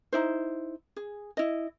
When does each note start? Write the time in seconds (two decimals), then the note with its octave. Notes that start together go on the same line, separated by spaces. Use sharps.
0.12 D#4 E4 C5
0.96 G#4
1.37 E4 D#5